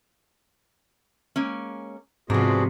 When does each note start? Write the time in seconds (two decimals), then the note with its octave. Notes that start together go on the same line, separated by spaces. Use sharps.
1.36 G#3 A#3 C#4
2.30 G#2 C3 F3 B3 D4 F#4 G#4